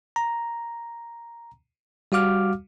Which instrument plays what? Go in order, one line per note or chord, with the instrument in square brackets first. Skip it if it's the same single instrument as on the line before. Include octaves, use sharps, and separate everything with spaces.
[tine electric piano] A#5
G3 F#4 F5 D6 F6